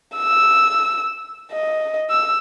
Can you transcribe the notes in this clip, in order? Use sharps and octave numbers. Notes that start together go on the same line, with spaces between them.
E6
D#5
E6